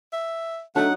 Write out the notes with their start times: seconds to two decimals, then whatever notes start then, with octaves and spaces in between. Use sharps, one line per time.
0.13 E5
0.76 F#3 A3 D4 D#4 F#5